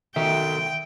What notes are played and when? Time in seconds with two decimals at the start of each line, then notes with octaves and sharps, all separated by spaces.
0.16 D#3 A4 E5 G5